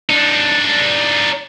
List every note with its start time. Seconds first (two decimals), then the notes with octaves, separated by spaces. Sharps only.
0.10 D4 D#4